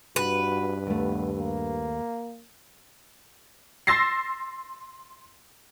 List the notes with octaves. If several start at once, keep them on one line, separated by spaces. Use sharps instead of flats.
G2 F#4 B4
D#2 A3 B3
A#3
C6 E6 A6 A#6 C7